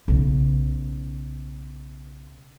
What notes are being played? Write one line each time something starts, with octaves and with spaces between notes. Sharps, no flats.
B1 C#3